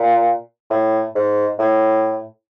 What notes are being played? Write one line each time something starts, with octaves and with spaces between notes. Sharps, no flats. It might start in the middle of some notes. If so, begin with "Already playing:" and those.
Already playing: A#2
A2
G#2
A2